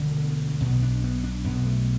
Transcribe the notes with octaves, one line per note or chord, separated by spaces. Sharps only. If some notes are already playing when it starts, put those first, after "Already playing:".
Already playing: E1 D2 D3 B3
B1 B2 B3
D4
B3
D4
B1 B2 B3
A3